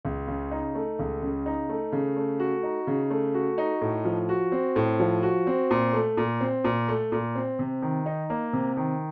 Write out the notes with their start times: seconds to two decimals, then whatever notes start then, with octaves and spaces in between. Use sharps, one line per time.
0.05 C#2
0.28 C#3
0.51 D#4
0.75 A3
0.99 C#2
1.22 C#3
1.46 D#4
1.69 A3
1.92 C#3
2.16 A3
2.40 F#4
2.63 D#4
2.87 C#3
3.10 A3
3.34 F#4
3.58 D#4
3.81 A2
4.05 F3
4.29 F#4
4.52 C4
4.76 A2
5.00 F3
5.23 F#4
5.47 C4
5.71 A#2
5.93 A3
6.17 A#2
6.41 C4
6.64 A#2
6.88 A3
7.12 A#2
7.35 C4
7.59 C3
7.82 D#3
8.06 D#4
8.30 A#3
8.53 C3
8.77 D#3